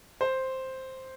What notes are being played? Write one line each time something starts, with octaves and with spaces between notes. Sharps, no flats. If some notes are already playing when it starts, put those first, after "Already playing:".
C5